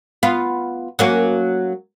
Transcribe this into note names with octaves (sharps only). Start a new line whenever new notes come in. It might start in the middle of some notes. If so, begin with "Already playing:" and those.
B3 F4
F#3 A#3 C#4